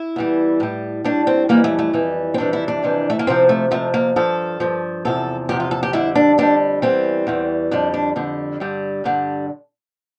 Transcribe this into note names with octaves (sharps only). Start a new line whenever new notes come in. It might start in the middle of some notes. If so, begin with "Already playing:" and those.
Already playing: E4
E2 E3 G3
A2 G3
A2 G3 D4
C4
F2 E3 G3 A#3
A3
A3
F2 E3 G3
C4
F2 C3 E3 G3 D4
E4
D4
F2 C3 E3 G3
A3
A#3
F2 C3 F3 C4
A3
F2 C3 F3 A3
A#3
G2 F3 A4
G2 F3
E2 C3 F3 A4
E2 C3 F3 G4
F4
A4
G4
F2 D3 G3 E4
D4
F2 D3 G3 D4
E2 E3 G3 C4
E2 E3 G3
F2 D3 G3 D4
D4
F2 D3 G3
G2 D3 G3
G2 D3 G3